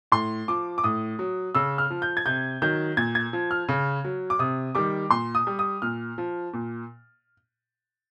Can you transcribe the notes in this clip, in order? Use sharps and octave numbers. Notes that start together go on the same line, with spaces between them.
A2 C6
F3 D6
D6
A2 D#6
F#3
C#3 E6
F6
F3
G6
G#6
C3 G6
D#3 F#3 G6
A#2 G#6
G#6
F3
F6
C#3
F#3
D6
C3 D#6
D#3 G3 D6
A#2 C6
D#6
G3
D#6
A#2 F6
F3
A#2